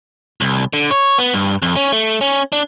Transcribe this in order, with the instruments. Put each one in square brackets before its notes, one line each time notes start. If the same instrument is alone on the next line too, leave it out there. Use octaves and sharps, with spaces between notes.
[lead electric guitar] C2
D3
C#5
B3
G2
F2
C#4
A3
C#4
D4